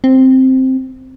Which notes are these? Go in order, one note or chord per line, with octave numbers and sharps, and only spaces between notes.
C4